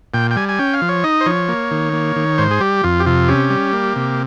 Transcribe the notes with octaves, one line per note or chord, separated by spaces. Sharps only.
A#2 G5
G5
G3 G#5
G#5
C#4 G5
F5
F3
C#5
D#4 D#5
C5
F3 C#5
A#3
D#3
A#3
D#3
G#2 C5
G#4
G3 G4
F2 F4
G4
C3 F4
C#4 G4
G3
A#3
C3